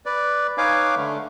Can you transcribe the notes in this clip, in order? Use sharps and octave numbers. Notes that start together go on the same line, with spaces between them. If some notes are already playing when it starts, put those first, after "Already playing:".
B4 D5
D#4 B4 C#5 F5 G#5 D6
D3 A3